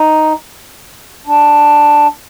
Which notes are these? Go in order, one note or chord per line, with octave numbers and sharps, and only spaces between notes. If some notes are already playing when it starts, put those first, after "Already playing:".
Already playing: D#4
D4